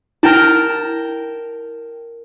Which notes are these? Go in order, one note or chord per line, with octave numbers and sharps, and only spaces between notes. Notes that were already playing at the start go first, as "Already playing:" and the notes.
E4 A#4 G5 A5